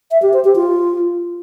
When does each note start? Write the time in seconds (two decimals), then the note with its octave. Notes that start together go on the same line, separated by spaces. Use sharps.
0.11 E5
0.22 G4
0.33 C5
0.44 G4
0.56 F4